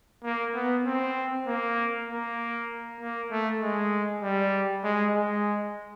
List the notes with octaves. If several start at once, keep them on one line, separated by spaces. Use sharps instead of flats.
A#3
B3
C4
A#3
A#3
A#3
A3
G#3
G3
G#3
G#3